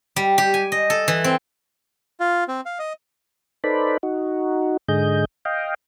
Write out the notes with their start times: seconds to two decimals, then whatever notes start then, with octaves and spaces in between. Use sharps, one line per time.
0.16 G3
0.38 G4
0.54 G#5
0.72 D#5
0.90 A4
1.08 E3
1.24 C4
2.20 F4
2.48 C4
2.66 F5
2.79 D#5
3.64 D#4 A4 B4 C5 D5 B5
4.03 D#4 F#4
4.88 G#2 D3 G#4 D#5 G6
5.45 D#5 F5 G5